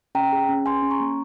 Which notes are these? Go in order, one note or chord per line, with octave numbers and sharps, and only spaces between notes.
C#4 G5 A#5
G#4
C#4
G#4 G#5 C6
C#4
A#5 C#6
A#3